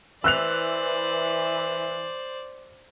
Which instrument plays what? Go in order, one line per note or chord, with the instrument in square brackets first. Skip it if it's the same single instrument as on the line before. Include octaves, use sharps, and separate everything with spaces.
[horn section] E3 [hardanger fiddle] C5 D5 [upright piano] E6 F#6 F7